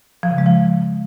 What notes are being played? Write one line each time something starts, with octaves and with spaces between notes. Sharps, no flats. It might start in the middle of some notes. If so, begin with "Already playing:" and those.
F3
C#3
G#3
F3